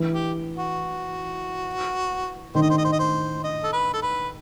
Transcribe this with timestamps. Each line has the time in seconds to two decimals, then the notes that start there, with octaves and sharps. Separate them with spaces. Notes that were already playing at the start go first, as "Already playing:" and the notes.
Already playing: E3
0.12 G4
0.57 F#4
2.55 D#3 C5
2.62 D#5
2.70 C5
2.78 D#5
2.84 C5
2.92 D#5
2.99 C5
3.44 D#5
3.64 A4
3.73 B4
3.94 A4
4.03 B4